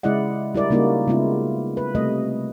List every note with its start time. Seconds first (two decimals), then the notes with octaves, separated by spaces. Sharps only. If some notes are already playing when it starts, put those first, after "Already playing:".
0.03 C#3 G#3 E4 D5 D#5 F#5
0.55 G3 E4 A#4 D5
0.70 C#3 G3 A#3 D#4 E4 F#4
1.08 C#3 G#3 B3 E4 F4
1.77 B4
1.95 C3 G3 A3 D#5